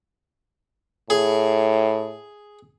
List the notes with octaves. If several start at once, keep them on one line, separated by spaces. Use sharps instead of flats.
A2 G#4